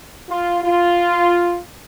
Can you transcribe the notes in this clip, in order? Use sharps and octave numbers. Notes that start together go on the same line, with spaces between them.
F4
F4